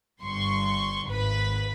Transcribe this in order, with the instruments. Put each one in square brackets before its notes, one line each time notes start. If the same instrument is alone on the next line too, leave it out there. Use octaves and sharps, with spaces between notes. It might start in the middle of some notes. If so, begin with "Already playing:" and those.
[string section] G1 G2 C6 C#6
G#1 B4 B5